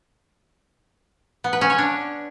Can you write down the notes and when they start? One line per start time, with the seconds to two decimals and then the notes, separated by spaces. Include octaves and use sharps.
1.44 B3
1.53 B4
1.61 C#4
1.70 C#5
1.78 D4